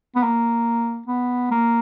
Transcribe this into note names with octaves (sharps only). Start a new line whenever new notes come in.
B3
A#3
B3
A#3